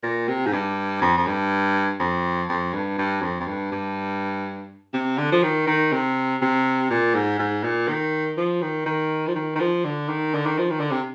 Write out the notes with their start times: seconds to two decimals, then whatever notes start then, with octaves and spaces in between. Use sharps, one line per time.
0.03 A#2
0.28 C3
0.46 G#2
0.53 G2
1.01 F2
1.18 F2
1.27 G2
2.00 F2
2.49 F2
2.73 G2
2.98 G2
3.22 F2
3.40 F2
3.47 G2
3.72 G2
4.94 C3
5.18 D3
5.32 F3
5.43 D#3
5.67 D#3
5.92 C3
6.42 C3
6.90 A#2
7.15 G#2
7.39 G#2
7.63 A#2
7.88 D#3
8.37 F3
8.62 D#3
8.86 D#3
9.27 F3
9.35 D#3
9.56 D#3
9.60 F3
9.84 D3
10.09 D#3
10.34 D3
10.46 D#3
10.58 F3
10.70 D#3
10.80 D3
10.91 C3